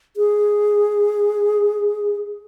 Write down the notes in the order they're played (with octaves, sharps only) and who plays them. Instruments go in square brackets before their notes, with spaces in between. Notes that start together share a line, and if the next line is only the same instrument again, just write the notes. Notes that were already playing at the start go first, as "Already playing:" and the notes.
[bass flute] G#4